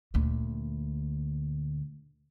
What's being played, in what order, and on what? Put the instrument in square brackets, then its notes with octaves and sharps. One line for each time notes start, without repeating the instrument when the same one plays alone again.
[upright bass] D2 A#2